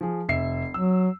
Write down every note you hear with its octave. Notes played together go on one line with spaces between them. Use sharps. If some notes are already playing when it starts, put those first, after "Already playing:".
F3 G#4
F1 E5 C7
F#3 E6